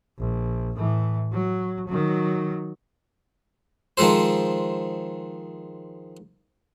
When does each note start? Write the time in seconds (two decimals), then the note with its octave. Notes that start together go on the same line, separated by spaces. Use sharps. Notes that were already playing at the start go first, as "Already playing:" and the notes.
0.18 A#1
0.76 A2 E3
1.32 F#3
1.87 D#3 F#3
3.97 D#3 F3 G#3 A4 C5